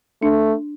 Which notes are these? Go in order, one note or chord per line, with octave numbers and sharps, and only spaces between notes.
A3 D4